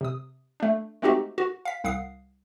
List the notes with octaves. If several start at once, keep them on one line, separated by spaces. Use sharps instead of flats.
C3 D#6
A3 D4
G#3 A3 C4 D#4 F#4 G4
F#4
F5 B6
C2 F5 F#5 D#6 C7